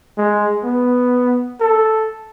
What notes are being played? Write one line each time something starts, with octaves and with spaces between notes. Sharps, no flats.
G#3
B3
A4